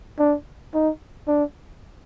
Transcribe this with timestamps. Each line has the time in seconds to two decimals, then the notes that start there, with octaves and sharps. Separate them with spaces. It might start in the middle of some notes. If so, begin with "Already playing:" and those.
0.19 D4
0.74 D#4
1.28 D4